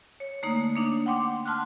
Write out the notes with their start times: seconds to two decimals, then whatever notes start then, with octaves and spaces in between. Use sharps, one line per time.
0.20 C#5
0.43 D3 A3 A#3 D#4
0.75 A#3 D4 D#4
1.06 F#5 G5 C6 D6
1.45 A5 C6 F6 F#6